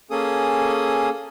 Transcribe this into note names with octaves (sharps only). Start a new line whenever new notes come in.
A#3 C#4 G#4 A4 D#6